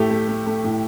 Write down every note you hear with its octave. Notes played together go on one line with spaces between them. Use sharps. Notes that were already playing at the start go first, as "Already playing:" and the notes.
Already playing: A2 A3 G4
A3
A3
A3
A2